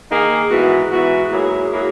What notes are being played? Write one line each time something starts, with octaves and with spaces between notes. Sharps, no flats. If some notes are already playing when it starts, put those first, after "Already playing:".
D#3 A#3 D#4 G#4
G#2 E3 B3 F#4
G#2 E3 B3 F#4
G#2 F#3 A#3 E4 G#4
F#3 A#3 E4 G#4